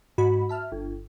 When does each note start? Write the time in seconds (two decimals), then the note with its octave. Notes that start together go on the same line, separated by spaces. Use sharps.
0.18 G#2 F#4 B5
0.49 E5 A5 F6
0.72 G1